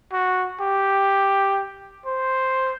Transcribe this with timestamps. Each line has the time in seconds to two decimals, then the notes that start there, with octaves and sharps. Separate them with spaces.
0.12 F#4
0.61 G4
2.05 C5